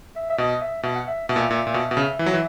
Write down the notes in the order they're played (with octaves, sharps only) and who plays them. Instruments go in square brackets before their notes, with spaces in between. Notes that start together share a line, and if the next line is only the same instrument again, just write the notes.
[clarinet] E5
E5
[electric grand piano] B2 [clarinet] D#5
[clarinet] E5
[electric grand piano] B2 [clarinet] E5
[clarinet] F#5
E5
[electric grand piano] B2 [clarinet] E5
[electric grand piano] A#2
A#2
A#2
B2
B2
C#3
E3
F#3
E3